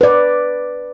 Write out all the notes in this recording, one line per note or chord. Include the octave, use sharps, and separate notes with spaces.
B4 D5